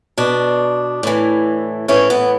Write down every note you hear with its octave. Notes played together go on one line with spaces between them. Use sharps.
B2 D4
A2 E3
A2 E3 C#4
B3